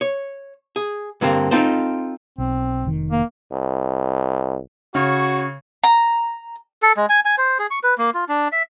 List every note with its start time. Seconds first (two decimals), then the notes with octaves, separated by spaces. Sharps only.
0.01 C#5
0.76 G#4
1.21 G2 D3 A#3 C4
1.51 C4 D#4 F4 A4 C5
2.38 B1 C4
2.85 F1 D#3
3.10 A#3
3.52 C2
4.95 C#3 F#4 C#5
5.84 A#5
6.82 A4
6.97 G#3
7.09 G#5
7.25 G#5
7.38 C5
7.59 G#4
7.71 C#6
7.84 B4
7.98 A#3
8.14 F4
8.29 D4
8.52 E5